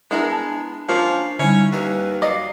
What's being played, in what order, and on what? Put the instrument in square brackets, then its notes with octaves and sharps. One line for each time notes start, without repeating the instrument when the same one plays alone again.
[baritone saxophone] G#3 [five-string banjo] B3 E4 A#4 [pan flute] D4 [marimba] F#5
[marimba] A5
[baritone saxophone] F3 [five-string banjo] A#3 C#4 [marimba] F5
[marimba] D3 G3 [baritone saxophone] C#4 [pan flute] D#4 [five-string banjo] E4
[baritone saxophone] D#2 [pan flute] B4
[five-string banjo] F#3 D5 D#5 [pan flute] F5